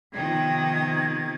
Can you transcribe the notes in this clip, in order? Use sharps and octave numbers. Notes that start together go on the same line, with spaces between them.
C3 D#3 F3 B3 D#4 G5 G#6